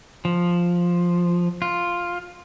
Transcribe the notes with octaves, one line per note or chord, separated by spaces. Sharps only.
F3
F4